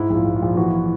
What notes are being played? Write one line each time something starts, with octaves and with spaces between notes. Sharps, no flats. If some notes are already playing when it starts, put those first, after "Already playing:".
Already playing: G#2 E4
A#1
F4
A#1
F4
A#1
E3 F#4